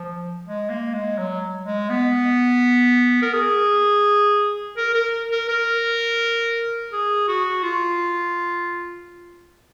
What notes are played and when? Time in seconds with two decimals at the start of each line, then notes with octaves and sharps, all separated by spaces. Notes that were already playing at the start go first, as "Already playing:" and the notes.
Already playing: F3
0.46 G#3
0.70 A#3
0.94 G#3
1.19 F#3
1.66 G#3
1.90 B3
3.22 A#4
3.33 G#4
4.77 A#4
4.94 A#4
5.31 A#4
5.49 A#4
6.92 G#4
7.28 F#4
7.64 F4